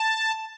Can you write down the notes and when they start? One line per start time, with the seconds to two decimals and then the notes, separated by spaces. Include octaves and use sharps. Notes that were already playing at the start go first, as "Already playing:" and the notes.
Already playing: A5